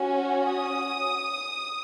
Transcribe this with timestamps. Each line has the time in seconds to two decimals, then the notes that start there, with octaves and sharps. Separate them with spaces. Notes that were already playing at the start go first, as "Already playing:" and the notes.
Already playing: C#4 F#4
0.47 D#6